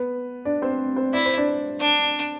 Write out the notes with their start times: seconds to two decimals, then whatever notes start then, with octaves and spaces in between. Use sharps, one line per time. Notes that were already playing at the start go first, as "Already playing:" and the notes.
Already playing: B3 B4
0.45 D4 D5
0.62 C4 C5
0.96 C4 C5
1.13 E4 D5
1.26 C5
1.38 D4 D5
1.80 D4